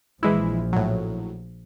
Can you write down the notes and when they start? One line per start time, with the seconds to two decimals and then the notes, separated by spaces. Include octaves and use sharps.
0.23 A#1 E3 F3 G#3 E4
0.73 A2 F#3